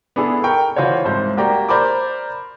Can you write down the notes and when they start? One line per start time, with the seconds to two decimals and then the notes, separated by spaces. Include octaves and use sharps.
0.16 B3 D4 E4 G#4 A4
0.43 A#4 G5 C#6
0.76 E3 F4 F#4 C5 C#5
1.05 C2 G#2 C5
1.37 A#3 F#4 G4 D5 G5 A#5
1.69 A#4 C5 D5 B5 D6